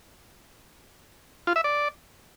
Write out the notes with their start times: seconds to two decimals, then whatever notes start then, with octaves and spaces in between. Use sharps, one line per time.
1.47 F4
1.56 E5
1.64 D5